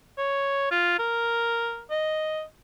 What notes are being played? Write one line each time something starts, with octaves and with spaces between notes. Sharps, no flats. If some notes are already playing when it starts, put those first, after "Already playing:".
C#5
F4
A#4
D#5